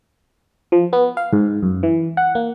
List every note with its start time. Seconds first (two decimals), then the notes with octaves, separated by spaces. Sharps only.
0.72 F3
0.93 B3
1.17 F5
1.33 G#2
1.63 F#2
1.83 E3
2.17 F#5
2.35 A#3